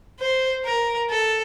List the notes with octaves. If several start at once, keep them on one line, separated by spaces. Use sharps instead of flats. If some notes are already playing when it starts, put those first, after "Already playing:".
C5
A#4
A4